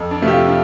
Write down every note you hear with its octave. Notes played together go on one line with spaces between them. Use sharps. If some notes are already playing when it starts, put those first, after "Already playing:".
Already playing: F2
D4
C3 F3 A3
G4
F4
D4